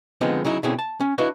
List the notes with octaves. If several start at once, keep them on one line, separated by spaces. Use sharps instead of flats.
D3 F3 G#3 B3 C4 D#4
C#3 F#3 D#4 E4
B2 D3 C4 C#4 E4 G#4
A5
C#4
D4 E4 F#4 B4 D#5 F5